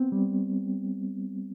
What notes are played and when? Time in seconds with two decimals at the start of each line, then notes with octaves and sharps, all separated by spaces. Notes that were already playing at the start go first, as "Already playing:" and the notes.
Already playing: B3 C4
0.12 G3